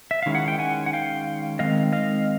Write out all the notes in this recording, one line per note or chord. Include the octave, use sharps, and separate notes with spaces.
E5
D#3 G#3 C#4 E4 F5
F#5
G5
F#5 G#5
F#5
F5 G5
D#3 G#3 C4 D#5 F5
D#5 F5